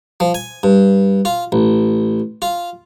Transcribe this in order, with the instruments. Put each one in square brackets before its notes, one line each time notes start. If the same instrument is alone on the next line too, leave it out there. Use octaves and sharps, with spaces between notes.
[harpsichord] F3
G#5
G2
F4
A1
F4